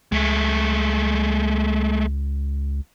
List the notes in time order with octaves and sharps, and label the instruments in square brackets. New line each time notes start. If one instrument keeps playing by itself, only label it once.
[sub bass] C#2 [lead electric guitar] G#3 A3